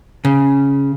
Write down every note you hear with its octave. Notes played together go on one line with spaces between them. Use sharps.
C#3